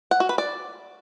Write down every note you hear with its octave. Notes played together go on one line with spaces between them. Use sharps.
F#5
F#4
B4
D5